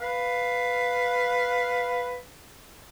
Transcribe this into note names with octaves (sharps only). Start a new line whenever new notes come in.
B4 F5